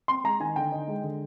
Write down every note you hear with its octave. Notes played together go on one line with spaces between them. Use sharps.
C4 C6
G#3 A#5
D#3 G#5
D3 G5
D#4
G#3
D3